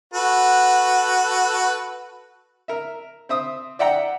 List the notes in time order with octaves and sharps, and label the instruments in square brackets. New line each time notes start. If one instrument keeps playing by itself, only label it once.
[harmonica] F#4 A4 B4
[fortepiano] A#4 E5
C4 E5 D#6
D5 E5 F#5 G5 A#5